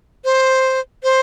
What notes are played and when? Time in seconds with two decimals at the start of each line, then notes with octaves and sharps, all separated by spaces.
0.25 C5
1.03 C5